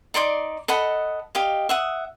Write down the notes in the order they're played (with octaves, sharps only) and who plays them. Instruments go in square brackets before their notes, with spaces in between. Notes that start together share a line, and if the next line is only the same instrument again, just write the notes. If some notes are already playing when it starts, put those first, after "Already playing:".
[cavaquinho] D#4 D5 C6 D6
A4 D#5 F#5 B5
G4 D#5 F5
E5 F#5 D#6